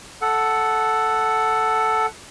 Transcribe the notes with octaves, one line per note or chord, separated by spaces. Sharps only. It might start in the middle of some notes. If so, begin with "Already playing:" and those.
A4 F#5